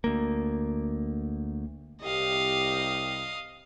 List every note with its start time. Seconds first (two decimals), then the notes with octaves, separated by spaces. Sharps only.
0.04 D2 A#3
2.02 C2 G4 D#5 F5